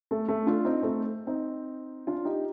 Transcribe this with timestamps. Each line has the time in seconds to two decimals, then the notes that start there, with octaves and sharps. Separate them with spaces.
0.11 A3
0.28 A3
0.47 D4 F4
0.65 C4 D#4
0.82 A3 C4
1.27 C4 D#4
2.07 D4 F4
2.25 D#4 G4